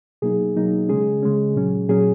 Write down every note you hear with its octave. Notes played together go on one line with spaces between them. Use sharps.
B2 F#3 A#3 D#4 G#4
B2 F#3 A#3 D#4
C#3 G#3 C#4 G#4
C#3 G#3 C#4
A#2 F#3 C#4
A#2 F#3 C#4 G#4